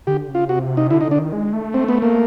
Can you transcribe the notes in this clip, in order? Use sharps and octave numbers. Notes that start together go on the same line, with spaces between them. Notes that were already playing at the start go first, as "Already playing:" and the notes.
D3 G4
C#3
F4
C3 F#4
D#4
D3 E4
D#4
D3
D4
D#3
G#3
A3
C4
B3
A#3